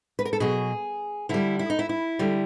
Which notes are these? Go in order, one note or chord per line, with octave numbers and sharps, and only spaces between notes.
B4
A#4
A4
B2 F#3 G#4
D3 G3 E4
E4
D#4
E4
E4
D3 G3